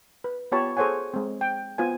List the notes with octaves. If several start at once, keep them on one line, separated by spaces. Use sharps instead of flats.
B4
B3 F4 G4 C#5 A5 B5
G#4 A4 C5 C#5 F#5 G#5
G#3 C4
G5
B3 F4 C5 G#5